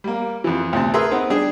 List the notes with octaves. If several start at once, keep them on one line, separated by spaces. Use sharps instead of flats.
G3 A#3
F2 E3
D2 C3 A5
G#4 A#4 B4 E5 C6
B3 C4 D#4
G3 D4 G4 G#4